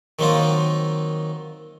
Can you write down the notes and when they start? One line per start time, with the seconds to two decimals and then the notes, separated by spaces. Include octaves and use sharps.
0.19 D#3 F#3 A#3 C4 D#4 F4